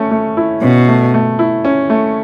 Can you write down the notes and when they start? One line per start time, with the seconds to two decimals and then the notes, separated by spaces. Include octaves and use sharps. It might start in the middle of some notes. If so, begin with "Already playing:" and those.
Already playing: A3 C#4
0.11 A3
0.37 E4
0.62 B2 C#4
0.88 A3
1.14 A3
1.39 E4
1.65 C#4
1.90 A3